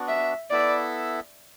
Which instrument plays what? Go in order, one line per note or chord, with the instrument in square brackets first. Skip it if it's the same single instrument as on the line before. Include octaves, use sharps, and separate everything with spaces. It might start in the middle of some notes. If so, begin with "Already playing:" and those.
Already playing: [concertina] B3 D4 F#4
[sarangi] E5
[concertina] B3 E4 A4 E5 [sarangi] D5